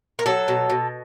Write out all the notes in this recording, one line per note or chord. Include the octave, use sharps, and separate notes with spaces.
A#4
F#3 A4
B2
B2